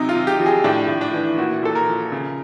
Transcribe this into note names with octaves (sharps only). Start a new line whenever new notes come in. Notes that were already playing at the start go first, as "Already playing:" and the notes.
Already playing: C3 F#3 D#4
F4
C3
G4
F3
G#4
A2 D4
A2
D4
E3
A#2 F#4
A#2 A4
A#4
F3
C#3